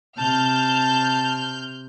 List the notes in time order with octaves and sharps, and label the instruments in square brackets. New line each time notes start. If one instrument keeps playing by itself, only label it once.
[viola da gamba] C3 [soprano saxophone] A5 [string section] F6 G6